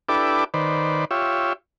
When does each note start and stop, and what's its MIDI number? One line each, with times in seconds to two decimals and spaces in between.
0.09 0.44 62
0.09 0.44 64
0.09 0.44 67
0.09 0.44 69
0.09 0.44 71
0.09 0.44 86
0.54 1.05 51
0.54 1.05 71
0.54 1.05 72
0.54 1.05 74
1.11 1.53 65
1.11 1.53 67
1.11 1.53 73
1.11 1.53 76